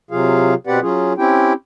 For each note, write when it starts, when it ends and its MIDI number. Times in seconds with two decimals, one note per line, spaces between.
0.11 0.54 48
0.11 0.54 54
0.11 0.54 65
0.11 0.54 68
0.11 0.54 77
0.67 0.80 47
0.67 0.80 60
0.67 0.80 67
0.67 0.80 71
0.67 0.80 74
0.67 0.80 78
0.82 1.13 54
0.82 1.13 61
0.82 1.13 65
0.82 1.13 68
1.18 1.53 60
1.18 1.53 61
1.18 1.53 64
1.18 1.53 67
1.18 1.53 79